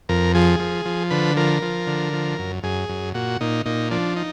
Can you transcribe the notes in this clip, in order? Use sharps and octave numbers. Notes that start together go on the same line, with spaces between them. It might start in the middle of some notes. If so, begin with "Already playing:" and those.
F2 A#4
F3 G#4
F3
F3
D3 B4
F3 A#4
F3
D3
F3
F#2
F#2 G#4
F#2
A#2 F#4
A#2 D#4
A#2 D#4
F3 D4
D#4